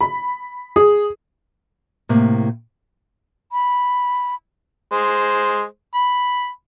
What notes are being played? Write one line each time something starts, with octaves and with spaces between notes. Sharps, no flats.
B5
G#4
A2 C3 A#3
B5
G#3 C5
B5